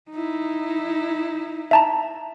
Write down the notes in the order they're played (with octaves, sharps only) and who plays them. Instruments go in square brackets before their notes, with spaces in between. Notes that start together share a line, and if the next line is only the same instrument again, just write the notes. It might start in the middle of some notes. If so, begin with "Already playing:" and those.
[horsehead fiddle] D#4 E4
[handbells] E5 A5 A#5